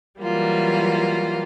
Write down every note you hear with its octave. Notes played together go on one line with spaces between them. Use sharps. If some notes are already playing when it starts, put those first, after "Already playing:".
E3 F#3 G3 A#3 F4